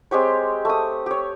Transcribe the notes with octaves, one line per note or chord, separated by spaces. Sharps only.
G#3 C4 G4 C#5
A3 D#6
G4 C#5